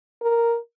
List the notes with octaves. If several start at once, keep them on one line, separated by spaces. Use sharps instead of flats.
A#4